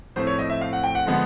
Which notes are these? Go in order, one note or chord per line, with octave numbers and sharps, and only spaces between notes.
A2 F3 A3 C4 C5
C#5
D#5
E5
F5
F#5
G5
F#5
D3 F3 G#3 B3 F#5